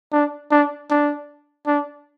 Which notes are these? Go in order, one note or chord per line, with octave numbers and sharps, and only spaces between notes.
D4
D4
D4
D4